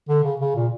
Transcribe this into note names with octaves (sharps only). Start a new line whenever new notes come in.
D3
C#3
C#3
A#2